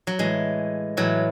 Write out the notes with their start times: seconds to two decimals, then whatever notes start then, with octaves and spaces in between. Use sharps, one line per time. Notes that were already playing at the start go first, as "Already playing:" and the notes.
0.07 F#3
0.19 A2 E3 G#3
0.97 A2 E3 F#3